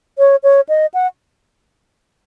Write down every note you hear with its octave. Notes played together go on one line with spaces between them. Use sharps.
C#5
C#5
D#5
F#5